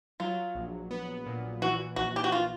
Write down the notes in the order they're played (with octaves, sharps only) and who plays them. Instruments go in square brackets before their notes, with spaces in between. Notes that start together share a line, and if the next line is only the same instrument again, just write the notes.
[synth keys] F#3 [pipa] F4
[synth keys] A#1
B3
A#2
[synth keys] E3 [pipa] F#4
[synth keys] A#1 [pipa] F#4
[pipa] G4
F#4
F4